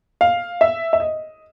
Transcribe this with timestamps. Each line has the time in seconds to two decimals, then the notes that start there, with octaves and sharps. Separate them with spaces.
0.21 F5
0.61 E5
0.93 E5
1.00 D#5